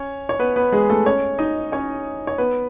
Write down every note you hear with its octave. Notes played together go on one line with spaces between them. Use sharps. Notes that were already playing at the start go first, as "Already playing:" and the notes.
Already playing: C#4 C#5
C#5
B3 B4
B3 B4
G#3 G#4
A3 A4
C#4 C#5
D#4 D#5
C#4 C#5
C#5
B3 B4